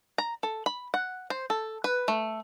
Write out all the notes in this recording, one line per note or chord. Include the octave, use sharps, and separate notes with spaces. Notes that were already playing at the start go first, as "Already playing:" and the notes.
A#5
A4
B5
F#5
C5
A4
B4
A3